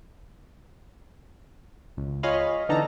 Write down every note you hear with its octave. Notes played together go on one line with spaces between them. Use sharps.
C#2
F4 G#4 C#5 D#5 F5 B5
D3 E3 B3 D#4 A4 A#5